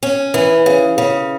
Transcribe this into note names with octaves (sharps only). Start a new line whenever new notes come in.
C#4
E3
C#3
C#3